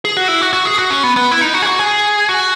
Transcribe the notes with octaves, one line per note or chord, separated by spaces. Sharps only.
G#4
F#4
E4
F#4
F#4
G#4
F#4
C#4
B3
B3
E4
D#4
F#4
G#4
F#4
G#4
F#4